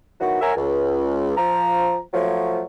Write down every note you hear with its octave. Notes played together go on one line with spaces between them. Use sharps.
D#3 E3 F#3 B3 F#4
A#4 C#5 E5 F#5 G#5 A#5
C#2
F3 A#5
F3 F#3 A3